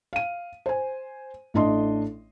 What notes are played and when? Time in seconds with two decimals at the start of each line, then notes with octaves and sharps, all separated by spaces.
0.13 F5 D#7
0.66 C5 G#5
1.54 A1 A3 D4 D#5 C6